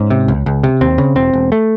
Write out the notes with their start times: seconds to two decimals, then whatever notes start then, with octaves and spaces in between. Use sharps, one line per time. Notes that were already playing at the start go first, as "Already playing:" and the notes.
Already playing: G#2 C#4
0.10 C3
0.28 C#2
0.46 C#2
0.64 C3
0.81 D#2 C4
0.98 C#3
1.16 E1 C4
1.33 E1
1.52 A3